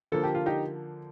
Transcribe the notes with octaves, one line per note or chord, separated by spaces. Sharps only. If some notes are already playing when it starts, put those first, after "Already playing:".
D3 F3 A#3 A4
G4
F4
D#4 G4